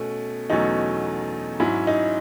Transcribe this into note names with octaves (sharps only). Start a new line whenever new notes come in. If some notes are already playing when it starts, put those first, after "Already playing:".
Already playing: B2 A3 C#4
E2 B2 F#3 A3 C#4 D#4
G#2 F#3 C#4 E4
D#4